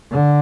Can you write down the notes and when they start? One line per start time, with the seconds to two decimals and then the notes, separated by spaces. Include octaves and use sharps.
0.11 D3